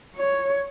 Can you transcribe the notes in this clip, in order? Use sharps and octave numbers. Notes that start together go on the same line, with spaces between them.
C#5